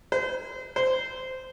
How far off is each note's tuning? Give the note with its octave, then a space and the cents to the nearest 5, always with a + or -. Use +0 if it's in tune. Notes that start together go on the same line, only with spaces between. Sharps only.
C5 -35
C5 -15